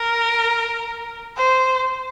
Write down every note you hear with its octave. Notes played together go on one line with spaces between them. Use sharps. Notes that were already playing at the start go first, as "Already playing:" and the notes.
Already playing: A#4
C5